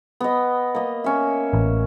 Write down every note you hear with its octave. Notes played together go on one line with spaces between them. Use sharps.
B3 D#5
A#3 D#5
C#4 E5
A1